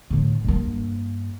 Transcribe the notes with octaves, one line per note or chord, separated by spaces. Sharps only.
A2 D3
G2 A#3